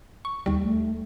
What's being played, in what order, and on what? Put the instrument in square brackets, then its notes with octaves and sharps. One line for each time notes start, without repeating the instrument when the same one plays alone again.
[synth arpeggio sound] C#6
D#2 G3
[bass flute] A3